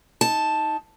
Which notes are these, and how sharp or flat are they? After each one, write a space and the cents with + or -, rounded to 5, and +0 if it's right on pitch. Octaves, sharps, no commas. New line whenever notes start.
D#4 +25 A5 +0